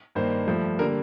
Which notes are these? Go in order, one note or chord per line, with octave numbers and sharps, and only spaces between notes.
G2 D#3 A#3 C5
G2 F3 A3
D3 G3 A#3 A#4